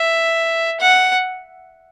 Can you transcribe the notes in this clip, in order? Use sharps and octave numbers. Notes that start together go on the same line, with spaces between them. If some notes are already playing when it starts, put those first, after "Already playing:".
Already playing: E5
F#5